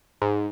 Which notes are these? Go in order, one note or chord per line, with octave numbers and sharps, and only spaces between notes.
G#2